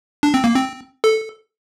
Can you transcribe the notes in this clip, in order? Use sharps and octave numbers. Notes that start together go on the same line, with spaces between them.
D4
C4
A#3
C4
A4